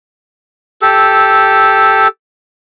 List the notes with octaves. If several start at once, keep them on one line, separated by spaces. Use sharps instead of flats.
G4 A4 E6